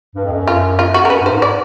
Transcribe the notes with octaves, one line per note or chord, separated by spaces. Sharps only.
G2
F2
F#2
F4
F4
F#4
A#4
F#2 B4
G2
C5
G#2
D5